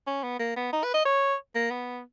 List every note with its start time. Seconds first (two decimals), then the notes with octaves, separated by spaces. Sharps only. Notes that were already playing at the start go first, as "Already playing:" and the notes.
0.07 C#4
0.23 B3
0.39 A#3
0.56 B3
0.73 D#4
0.84 B4
0.94 D#5
1.05 C#5
1.55 A#3
1.71 B3